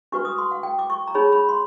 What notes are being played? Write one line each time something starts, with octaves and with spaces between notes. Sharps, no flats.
D4 F#4 B4 C#6
D#6
C6
F#5
G5
D6
C#6
A#5
D#4 G#4 C#5 B5
B5
C6